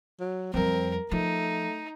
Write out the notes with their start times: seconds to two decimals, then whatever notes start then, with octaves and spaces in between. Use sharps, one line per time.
0.20 F#3
0.54 F2 G3 C4 A#4
1.11 F3 A3 D#4